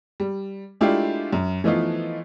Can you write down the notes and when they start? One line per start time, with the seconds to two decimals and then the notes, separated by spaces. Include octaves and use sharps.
0.20 G3
0.81 G#3 A3 D4 E4 F4 G4
1.33 F#2
1.64 E3 F3 A3 B3 D#4 F4